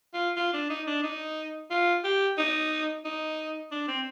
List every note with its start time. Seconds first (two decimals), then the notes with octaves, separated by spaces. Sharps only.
0.14 F4
0.36 F4
0.53 D4
0.70 D#4
0.87 D4
1.03 D#4
1.70 F4
2.04 G4
2.38 D#4
3.05 D#4
3.71 D4
3.88 C4